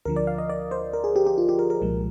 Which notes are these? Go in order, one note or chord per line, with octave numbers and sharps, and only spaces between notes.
D2 D3 F3 A#4
D5
F5
D#5
D5
C5
A#4
G#4
G4
G4
F4
G4
A#4
A#4
C2 A#2 F3 G#3